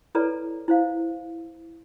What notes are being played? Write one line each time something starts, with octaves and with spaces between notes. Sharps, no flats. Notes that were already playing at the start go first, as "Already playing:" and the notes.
E4 A4 B4 C#5 D5 A#5
E4 C5 F5